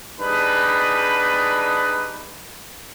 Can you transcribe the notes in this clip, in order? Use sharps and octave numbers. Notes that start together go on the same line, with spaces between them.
G3 D4 D#4 G#4 B4 B5